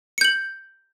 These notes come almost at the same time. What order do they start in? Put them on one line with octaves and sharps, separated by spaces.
C#7 G6 F#7